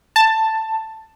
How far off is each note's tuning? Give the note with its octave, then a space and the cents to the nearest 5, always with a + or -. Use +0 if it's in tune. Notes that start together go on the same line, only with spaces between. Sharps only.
A5 +10